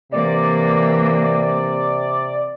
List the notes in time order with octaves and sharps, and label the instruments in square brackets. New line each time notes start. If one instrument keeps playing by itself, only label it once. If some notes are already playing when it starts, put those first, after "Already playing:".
[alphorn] C3 [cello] E3 A#3 [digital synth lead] D5